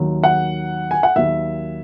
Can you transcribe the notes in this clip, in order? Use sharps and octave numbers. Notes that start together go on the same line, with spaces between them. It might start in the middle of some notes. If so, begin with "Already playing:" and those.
Already playing: D#2 D#3 F#3
F#5
G#5
F#5
D#2 D#3 F#3 E5